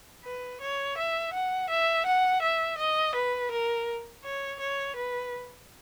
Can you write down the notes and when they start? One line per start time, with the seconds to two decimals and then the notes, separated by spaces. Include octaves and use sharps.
0.24 B4
0.61 C#5
0.98 E5
1.34 F#5
1.70 E5
2.06 F#5
2.42 E5
2.78 D#5
3.15 B4
3.51 A#4
4.24 C#5
4.60 C#5
4.96 B4